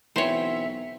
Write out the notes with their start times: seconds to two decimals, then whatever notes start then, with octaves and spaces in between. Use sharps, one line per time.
0.16 B1 E3 F#3 C4 C5 C#5 E5